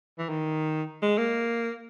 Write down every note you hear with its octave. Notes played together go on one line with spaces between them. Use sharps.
E3
D#3
G#3
A#3